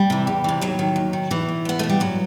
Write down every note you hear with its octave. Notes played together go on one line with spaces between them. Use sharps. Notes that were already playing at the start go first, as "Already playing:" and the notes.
Already playing: G3
C3 E3
E2
C3 E3
D#2 F#3
D#3
D#2
D#3
E2 E3
B2
E2 B3
B2 A3
G3
G2 F#3